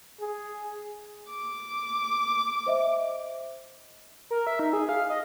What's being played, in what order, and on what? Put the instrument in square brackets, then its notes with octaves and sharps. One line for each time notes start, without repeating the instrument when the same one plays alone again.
[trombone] G#4
[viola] D6
[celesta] C5 D#5 E5
[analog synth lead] A#4
E5
D#4
G#4
F5
D#5